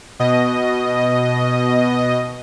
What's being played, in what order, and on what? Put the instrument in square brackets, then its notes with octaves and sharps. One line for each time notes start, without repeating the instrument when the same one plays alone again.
[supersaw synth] B2 D#5